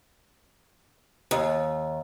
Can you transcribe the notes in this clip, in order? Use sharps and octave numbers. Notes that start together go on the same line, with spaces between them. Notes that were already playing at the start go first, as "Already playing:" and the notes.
D#2